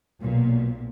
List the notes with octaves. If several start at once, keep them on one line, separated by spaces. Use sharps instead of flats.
B1 A#2